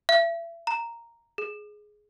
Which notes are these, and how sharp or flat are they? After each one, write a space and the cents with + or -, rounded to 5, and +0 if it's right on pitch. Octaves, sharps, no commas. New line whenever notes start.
E5 +35
A#5 -5
G#4 +10